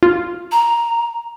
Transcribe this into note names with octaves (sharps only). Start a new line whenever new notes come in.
F4
A#5